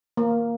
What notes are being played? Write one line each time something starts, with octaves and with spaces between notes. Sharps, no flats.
A#3